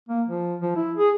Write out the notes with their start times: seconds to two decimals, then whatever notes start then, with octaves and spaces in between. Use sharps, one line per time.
0.09 A#3
0.29 F3
0.62 F3
0.76 E4
0.97 G#4